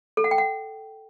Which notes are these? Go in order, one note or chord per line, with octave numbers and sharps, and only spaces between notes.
A4
F#5
G5
F#5